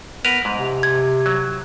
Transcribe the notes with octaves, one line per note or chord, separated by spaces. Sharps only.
B3 A#4 B4 F7
G#2 G#3
C3
G#6
F#3